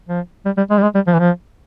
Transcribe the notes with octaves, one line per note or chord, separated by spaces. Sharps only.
F3
G3
G3
G#3
G3
G#3
G3
F3
E3
F3